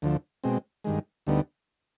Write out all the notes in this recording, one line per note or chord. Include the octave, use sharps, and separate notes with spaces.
D2 D3 F3
B2 G#3 C4
G2 D#3 G#3
D2 D3 G3 B3 D#4